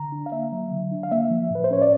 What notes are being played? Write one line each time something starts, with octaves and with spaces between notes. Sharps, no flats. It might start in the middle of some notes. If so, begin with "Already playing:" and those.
Already playing: D3 A#5
D4
F5
A#3 E5
F#3
D3
D4
F5
A#3 E5
F3
A2 B4
C5
C#4 C#5
D5